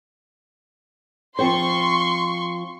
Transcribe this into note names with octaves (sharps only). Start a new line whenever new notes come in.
F3 C4 C5 C6 C#6